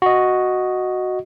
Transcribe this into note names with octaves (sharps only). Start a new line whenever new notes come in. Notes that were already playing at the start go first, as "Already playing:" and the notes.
F#4 D#5